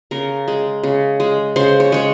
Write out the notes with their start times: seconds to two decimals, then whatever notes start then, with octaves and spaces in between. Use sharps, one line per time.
0.11 C#3 A#4
0.48 G#3
0.83 C#3
1.20 G#3
1.56 C#3 C5
1.80 C#5
1.92 G#3 C#5